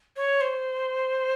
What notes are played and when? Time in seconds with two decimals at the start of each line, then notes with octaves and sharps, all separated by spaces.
0.16 C#5
0.41 C5